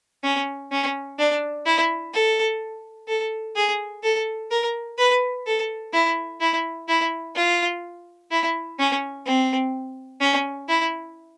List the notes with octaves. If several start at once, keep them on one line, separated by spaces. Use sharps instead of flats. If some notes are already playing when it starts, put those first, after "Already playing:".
C#4
C#4
D4
E4
A4
A4
G#4
A4
A#4
B4
A4
E4
E4
E4
F4
E4
C#4
C4
C#4
E4